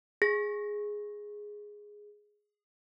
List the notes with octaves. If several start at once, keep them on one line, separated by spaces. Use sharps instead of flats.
G#4 A#6